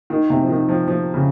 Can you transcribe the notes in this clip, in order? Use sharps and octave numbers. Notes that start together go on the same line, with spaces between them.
D#3
C3
F3
D#3
F3
F3
C#3